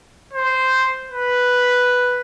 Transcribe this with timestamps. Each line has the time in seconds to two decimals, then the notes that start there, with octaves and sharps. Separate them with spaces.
0.33 C5
1.11 B4